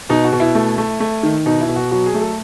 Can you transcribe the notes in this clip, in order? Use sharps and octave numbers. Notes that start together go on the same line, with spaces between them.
B2 D#4
F#4
B2
E4
A3
A3
A3
D#3
B2 D#4
E4
B2
F#4
F#3 F#4
G#4
A3
A4